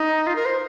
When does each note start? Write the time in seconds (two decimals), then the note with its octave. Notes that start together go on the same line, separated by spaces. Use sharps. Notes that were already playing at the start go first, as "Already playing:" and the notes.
Already playing: D#4
0.27 F4
0.36 A#4
0.45 C5